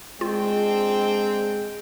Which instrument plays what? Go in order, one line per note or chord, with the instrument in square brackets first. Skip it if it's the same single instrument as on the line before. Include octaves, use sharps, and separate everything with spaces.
[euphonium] G#3 [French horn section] C4 D4 [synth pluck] F4 [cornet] G5